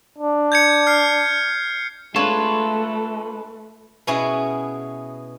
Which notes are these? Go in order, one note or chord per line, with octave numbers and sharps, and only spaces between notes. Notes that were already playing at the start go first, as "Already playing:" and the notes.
D4
G6 G#6 C#7
F6 C7
G#3 A3 D4 F4 A4 B4 C#5
B2 B3 C#4 E4 G#4